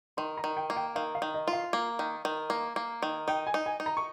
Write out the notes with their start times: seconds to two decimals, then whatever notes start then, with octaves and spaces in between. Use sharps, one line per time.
0.17 D#3 C6
0.38 A#5
0.44 D#3
0.57 G5
0.70 A#3
0.77 G5
0.95 D#3 F5
1.15 F5
1.22 D#3
1.34 D#5
1.48 F4
1.53 F5
1.73 A#3
1.99 D#3
2.25 D#3
2.50 A#3
2.76 A#3
3.03 D#3
3.28 D#4 G5
3.47 G#5
3.54 D#4
3.66 G#5
3.80 D#4
3.86 A#5
3.97 C#6